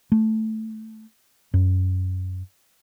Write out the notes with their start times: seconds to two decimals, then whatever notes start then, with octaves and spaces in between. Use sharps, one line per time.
0.12 A3
1.54 F#2